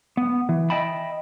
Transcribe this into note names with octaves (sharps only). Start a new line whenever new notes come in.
B3
E3
D#5 E5 G5 A5 B5